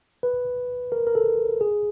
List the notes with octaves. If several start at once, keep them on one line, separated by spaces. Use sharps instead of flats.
B4
A#4
A#4
A4
G#4